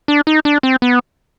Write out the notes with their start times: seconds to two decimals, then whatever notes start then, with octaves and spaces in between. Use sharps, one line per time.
0.08 D4
0.27 D#4
0.45 D4
0.63 C4
0.82 B3